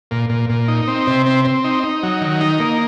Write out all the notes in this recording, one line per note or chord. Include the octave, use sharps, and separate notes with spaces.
A#2
A#2
A#2
D#4
C4
C3
C4
C4
D#4
D#4
F#3
D#3
D#4
A#3